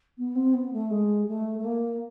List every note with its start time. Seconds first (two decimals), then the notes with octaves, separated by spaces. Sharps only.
0.18 B3
0.35 C4
0.54 B3
0.73 A3
0.91 G#3
1.28 A3
1.59 A3
1.65 A#3